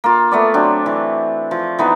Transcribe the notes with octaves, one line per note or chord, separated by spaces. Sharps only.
A#3 F4
A3 B3 D5
F#3 C4 D4
E3
F3
E3 B3 D#4